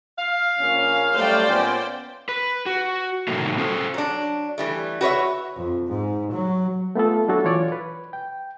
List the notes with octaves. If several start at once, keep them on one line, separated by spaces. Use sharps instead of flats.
F5
A#1 A#3 C#4
F#3 G3 A3 C5 D5 G5
A#2 B3 C#4
B4
F#4
A2 C3 D#3 F#3 A3 A#3
C#4 A4 C5
F#3 D4
E3 G3 A3
F#4 B4 C#5 E5
F2
G#2
F#3
A3 B3 F4 A4
F#3 D4 E4 F#4 A4
E3 F4 C#5 D5
B4
G5